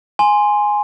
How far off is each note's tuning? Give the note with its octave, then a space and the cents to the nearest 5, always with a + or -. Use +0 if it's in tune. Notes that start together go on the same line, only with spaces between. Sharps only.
G#5 +0 C6 +0